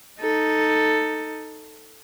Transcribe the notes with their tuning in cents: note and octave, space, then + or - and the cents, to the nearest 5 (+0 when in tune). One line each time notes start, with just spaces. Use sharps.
D#4 +0 A4 +5